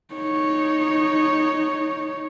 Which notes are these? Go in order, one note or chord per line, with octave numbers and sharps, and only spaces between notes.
D#4 C#5